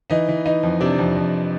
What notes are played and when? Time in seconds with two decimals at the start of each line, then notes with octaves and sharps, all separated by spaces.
0.10 E3 D#4 D#5
0.28 E3
0.45 E3 D#4 D#5
0.63 F2
0.81 C3 D4 D5
0.99 F2
1.16 F2